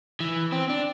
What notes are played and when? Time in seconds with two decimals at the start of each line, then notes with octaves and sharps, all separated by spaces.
0.20 E3
0.52 C4
0.70 D4